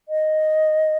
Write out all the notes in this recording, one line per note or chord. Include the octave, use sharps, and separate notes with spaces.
D#5